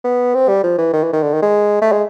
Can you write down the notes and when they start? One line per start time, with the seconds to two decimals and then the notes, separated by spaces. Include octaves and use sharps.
0.04 B3
0.34 C4
0.49 G3
0.64 F3
0.78 E3
0.93 D#3
1.03 E3
1.13 D#3
1.23 D3
1.33 D#3
1.42 G#3
1.82 A3
1.92 G#3